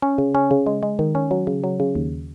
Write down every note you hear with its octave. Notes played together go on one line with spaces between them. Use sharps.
C#4
C#3
C#4
C#3
G#3
G#3
D#3
C#4
F#3
C#3
F#3
C#3
D#2